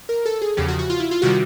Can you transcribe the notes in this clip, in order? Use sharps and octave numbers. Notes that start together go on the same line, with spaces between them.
A#4
A4
G#4
E2 C#3 F3 G4
F#4
F#4
F4
E4
F4
C3 D#3 G3 F#4